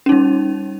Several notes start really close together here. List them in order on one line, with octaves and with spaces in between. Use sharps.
C#4 D#4 G3